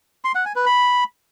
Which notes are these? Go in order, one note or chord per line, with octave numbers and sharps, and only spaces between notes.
C6
F#5
G#5
B4
B5